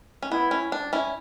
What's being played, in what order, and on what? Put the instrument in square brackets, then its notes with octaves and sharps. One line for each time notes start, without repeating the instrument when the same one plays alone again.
[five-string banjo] C#4
[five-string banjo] B3 [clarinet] E4
[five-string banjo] C#4
D4
C#4 E4